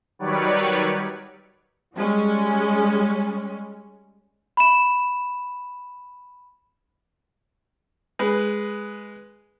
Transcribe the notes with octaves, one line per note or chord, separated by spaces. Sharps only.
D#3 F#3 G3 B4 C#5 D5
G3 G#3 C#4
B5 E7
G#3 B4